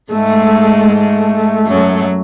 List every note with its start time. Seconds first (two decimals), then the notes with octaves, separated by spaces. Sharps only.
0.12 G#2 G#3 A3
0.90 A3
1.67 F#2 F#3